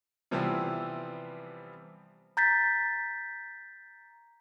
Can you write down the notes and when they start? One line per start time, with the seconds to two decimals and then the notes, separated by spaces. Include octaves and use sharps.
0.31 C3 E3 F3 G3 B3 C4
2.37 A#5 G6 A6 B6